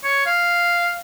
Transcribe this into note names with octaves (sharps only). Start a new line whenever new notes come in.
C#5
F5